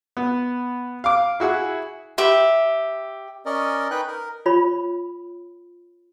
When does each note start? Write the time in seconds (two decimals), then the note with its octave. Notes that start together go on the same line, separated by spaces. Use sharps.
0.17 B3
1.04 F5 D6
1.40 E4 F#4 G#4
2.18 G4 E5 B5
3.46 C#4 A#4 D5 D#5
3.91 D#4 B4 G5 F#6
4.08 A#4
4.46 F4 C#5 B5